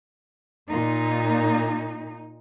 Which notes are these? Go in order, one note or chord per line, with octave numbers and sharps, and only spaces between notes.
A#2 D#4